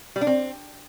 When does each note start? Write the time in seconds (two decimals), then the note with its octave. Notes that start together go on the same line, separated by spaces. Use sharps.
0.16 G3
0.21 D4
0.27 C4